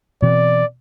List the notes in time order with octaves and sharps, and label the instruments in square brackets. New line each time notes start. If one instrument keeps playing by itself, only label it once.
[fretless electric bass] B2 E3 C4 [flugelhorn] D5